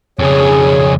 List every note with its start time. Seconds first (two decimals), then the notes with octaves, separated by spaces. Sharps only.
0.19 F2 C#3 G#4 C#5